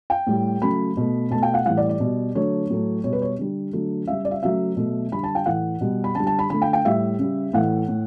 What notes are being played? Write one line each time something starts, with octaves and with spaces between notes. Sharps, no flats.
G5
A2 G3
C#3 F#3 A3 B5
B2 A3
B2 A3 A5
G5
F#5
A2 E3 G3 F#5
D5
D5
B2 G3
D3 F#3 A3 C#5
A2 F#3 A3
B2 G3 C#5
B4
C#5
D3 G3
D3 F#3 A3
C#3 G3 E5
D5
E5
C#3 F#3 A3 E5
B2 F#3 A3
D3 G3 B5
A5
G5
A2 E3 A3 F#5
B2 G3
B5
D3 G3 A5
A5
B5
D3 A3 B5
G5
G5
A2 G3 E5
C#3 G3
A2 E3 A3 F#5
A2